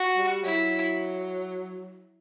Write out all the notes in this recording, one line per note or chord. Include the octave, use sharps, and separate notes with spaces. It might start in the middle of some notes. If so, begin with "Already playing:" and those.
Already playing: F#4
G3
F#3 E4